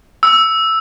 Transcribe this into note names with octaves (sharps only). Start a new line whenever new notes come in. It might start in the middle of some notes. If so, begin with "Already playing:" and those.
E6